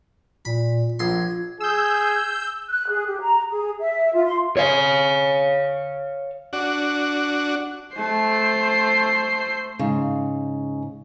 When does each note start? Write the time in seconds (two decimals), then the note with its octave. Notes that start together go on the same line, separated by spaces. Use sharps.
0.45 A#2 B5
0.99 A#1 C6 G#6
1.60 G#4 E6 G6
2.67 F#6
2.89 G#4
3.07 G4
3.22 A#5
3.51 G#4
3.80 E5
4.15 F4
4.26 C6
4.57 C#5 F5
6.53 D4 F#4
7.97 A3 C5 C7
9.79 G#2 C#3